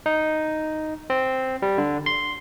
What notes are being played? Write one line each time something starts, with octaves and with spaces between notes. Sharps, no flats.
D#4
C4
G3
D3
C6